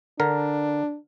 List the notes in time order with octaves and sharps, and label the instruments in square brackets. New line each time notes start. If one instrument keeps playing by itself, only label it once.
[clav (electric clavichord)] D3 A#4 [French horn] D4